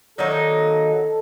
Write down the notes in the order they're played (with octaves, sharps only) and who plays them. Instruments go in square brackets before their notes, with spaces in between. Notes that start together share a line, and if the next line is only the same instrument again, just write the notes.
[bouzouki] D#3 F#3 A#3 D#4 [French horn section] A4